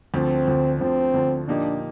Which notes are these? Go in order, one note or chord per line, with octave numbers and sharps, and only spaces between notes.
D2 D3 F3 C4
D2 D3 F3
D2 D3 F3 C4
D2 D3 F3
A#2 F3 A#3 D4 D#4 G4